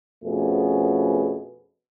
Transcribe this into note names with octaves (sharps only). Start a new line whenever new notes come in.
F2 B2 A3 B3 C#4 G#4